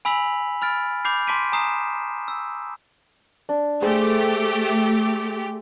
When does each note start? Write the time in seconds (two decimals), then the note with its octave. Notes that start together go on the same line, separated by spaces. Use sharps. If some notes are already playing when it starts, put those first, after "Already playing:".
0.05 G#5 B5 E6 B6 F7 F#7
0.62 B5 F6 A6 D7
1.05 B5 D6 G6 C7
1.27 A5 C6 D6 B6 D7 D#7
1.52 G#5 A#5 D#6 C7 E7
2.28 E6
3.49 D4
3.82 A3 G4 G#4 C5 D#6